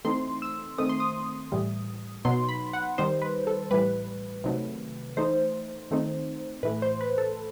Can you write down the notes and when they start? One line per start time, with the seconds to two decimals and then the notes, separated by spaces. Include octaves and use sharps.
0.05 E3 A3 C4 D#4 C6
0.42 E6
0.78 D#3 A3 C4 D#6
0.89 C6
1.00 D#6
1.52 A2 E3 G3
2.25 B2 F#3 B3 D#4 C6
2.49 B5
2.73 F#5
2.98 D#3 G3 D#4 C5
3.22 B4
3.47 A4
3.71 A2 E3 G3 B4
4.44 C3 D#3 F#3 A3
5.17 E3 A3 D#4 C5
5.91 D#3 A3 C4 D#4
6.63 A2 E3 A3 B4
6.82 C5
7.01 B4
7.18 A4